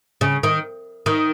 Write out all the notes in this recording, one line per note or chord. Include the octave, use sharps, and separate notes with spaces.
C#3
D#3
D#3